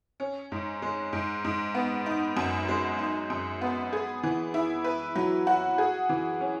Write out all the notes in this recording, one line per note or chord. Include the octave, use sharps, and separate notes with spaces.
C#4
G#2
G#3
G#2
G#2
B3
D#4
F#2
G#3
D#4
F#2
B3
G#4
E3
E4
B4
F#3
F#4
G#4
E3
C#4